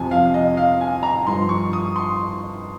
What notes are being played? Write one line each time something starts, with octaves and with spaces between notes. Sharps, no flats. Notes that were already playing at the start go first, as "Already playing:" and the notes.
Already playing: F2 C3 F3 G#5
F5
D#5
F5
G#5
A#5
G2 F3 C6
C#6
D#6
C6